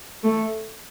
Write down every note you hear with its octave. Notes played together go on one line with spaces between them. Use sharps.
A3